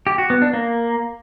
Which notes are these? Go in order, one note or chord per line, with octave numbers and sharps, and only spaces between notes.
G4
F#4
B3
D4
A#3